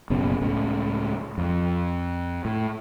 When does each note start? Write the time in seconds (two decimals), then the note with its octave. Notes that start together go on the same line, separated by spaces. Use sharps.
0.10 F#1 B2 C#4
0.41 C#2 A2 C#3
1.38 F2
2.45 A2